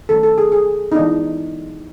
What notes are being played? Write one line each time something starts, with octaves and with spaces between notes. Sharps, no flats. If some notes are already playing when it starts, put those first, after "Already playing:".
D#3 F#3 A3 C#4 A4
A4
G#4
G#4
D#4
E3 G#3 B3 D4